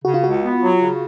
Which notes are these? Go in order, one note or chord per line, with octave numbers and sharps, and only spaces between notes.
C#3 F#4
F4
C#2 F#4
B3
F#3
C#3